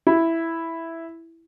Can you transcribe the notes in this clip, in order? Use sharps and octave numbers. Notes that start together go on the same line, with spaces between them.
E4